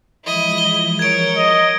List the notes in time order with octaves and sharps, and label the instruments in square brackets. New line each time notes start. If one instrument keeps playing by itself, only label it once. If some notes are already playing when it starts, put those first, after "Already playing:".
[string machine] E3 F3 G#3 [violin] E4 D#5
[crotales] G7
[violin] A#4 C#5 [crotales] G#6 D7
[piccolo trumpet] D#5